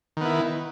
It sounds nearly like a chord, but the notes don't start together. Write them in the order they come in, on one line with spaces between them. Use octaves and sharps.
D#3 B3 E4